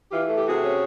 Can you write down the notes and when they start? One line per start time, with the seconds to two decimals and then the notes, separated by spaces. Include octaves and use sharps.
0.11 E3 F4 G4
0.27 A3
0.35 G4
0.45 C3 F#4 G#4
0.62 C#4